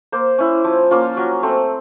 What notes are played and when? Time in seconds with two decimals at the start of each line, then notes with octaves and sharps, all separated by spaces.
0.12 A#3 C5
0.38 C#4 E4
0.64 F3
0.91 A#3 C#4 F4
1.17 F#3
1.43 A3 C4